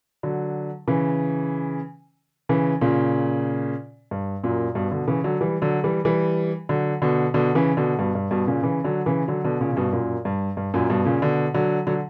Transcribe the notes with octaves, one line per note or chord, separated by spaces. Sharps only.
D3 F#3
C#3 E3
C#3 E3
A#2 C#3
G2
F#2 A#2
G2 B2
B2 D3
C#3 E3
D3 F#3
E3 G3
D3 F#3
E3 G3
E3 G3
D3 F#3
B2 D3
B2 D3
C#3 E3
B2 D3
G2 B2
G2
G2 B2
A#2 C#3
C#3 E3
D3 F#3
C#3 E3
D3 F#3
B2 D3
A#2 C#3
C#3
G2 B2
F#2 A#2
G2
G2
F#2 A#2
G2 B2
A#2 C#3
B2 D3
D3 F#3
D3 F#3